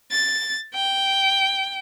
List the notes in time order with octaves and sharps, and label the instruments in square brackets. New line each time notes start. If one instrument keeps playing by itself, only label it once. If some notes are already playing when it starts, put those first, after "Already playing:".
[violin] A6
G5